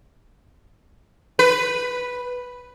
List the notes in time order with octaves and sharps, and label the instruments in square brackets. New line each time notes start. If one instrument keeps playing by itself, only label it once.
[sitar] B4